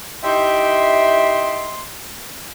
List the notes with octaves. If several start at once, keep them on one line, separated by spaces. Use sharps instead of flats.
D#4 E4 G4 E5 G5 C6